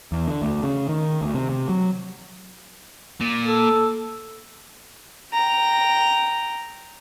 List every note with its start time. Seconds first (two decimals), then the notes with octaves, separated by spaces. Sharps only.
0.12 E2
0.27 D3
0.42 D2
0.63 C#3
0.89 D#3
1.22 D2
1.34 C3
1.50 C3
1.69 F#3
3.21 A#2
3.46 A4
5.32 G5 A#5